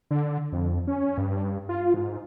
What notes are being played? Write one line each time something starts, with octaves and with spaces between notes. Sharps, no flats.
D3
F2
C#4
G2
F4
G#2